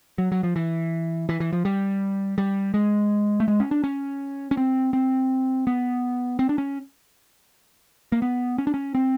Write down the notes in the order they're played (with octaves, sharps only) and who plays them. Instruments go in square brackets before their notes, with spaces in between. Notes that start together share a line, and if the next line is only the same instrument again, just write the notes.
[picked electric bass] F#3
F#3
F3
E3
E3
E3
F3
G3
G3
G#3
A3
G#3
C#4
D4
C#4
C#4
C4
C4
B3
C4
D4
C#4
A#3
B3
C#4
D4
C#4
C4